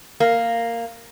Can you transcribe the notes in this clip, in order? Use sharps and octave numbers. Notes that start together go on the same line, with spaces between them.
A#3